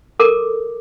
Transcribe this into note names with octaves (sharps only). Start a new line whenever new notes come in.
A4 A#4 D6